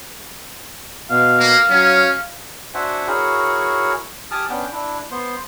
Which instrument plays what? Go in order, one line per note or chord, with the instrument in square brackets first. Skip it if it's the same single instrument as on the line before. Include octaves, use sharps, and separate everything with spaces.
[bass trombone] B2 [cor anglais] F5
[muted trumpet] A#3
[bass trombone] F#3 [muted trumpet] C#4
[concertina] D4 F#4 C5 E5 F#5 G#5
E4 F#4 G#4 A#4 C#5
G4 G#5 A5 D6 D#6 F6
B3 C#4 D4 G5
D4 E4
B3 C5 C6